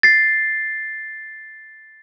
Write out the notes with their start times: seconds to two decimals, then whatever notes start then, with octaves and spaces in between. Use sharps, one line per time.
0.03 A6 C7